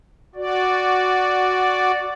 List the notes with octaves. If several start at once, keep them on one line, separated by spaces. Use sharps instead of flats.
F#4 D5